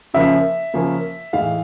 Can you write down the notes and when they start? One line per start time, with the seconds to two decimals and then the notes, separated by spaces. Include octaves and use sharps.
0.14 C#3 F3 A#3 C#4 E5
0.74 C#3 F3 A#3 C#4
1.33 A2 E3 G#3 F5